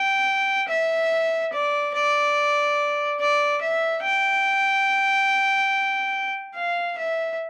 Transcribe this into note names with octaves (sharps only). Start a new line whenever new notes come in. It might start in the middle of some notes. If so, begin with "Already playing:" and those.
Already playing: G5
E5
D5
D5
D5
E5
G5
F5
E5